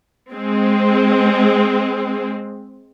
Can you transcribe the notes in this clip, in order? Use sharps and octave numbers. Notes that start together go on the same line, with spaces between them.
G#3 C4